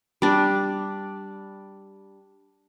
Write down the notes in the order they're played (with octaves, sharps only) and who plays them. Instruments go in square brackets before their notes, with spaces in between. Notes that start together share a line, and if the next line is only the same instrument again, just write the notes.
[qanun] G3 D4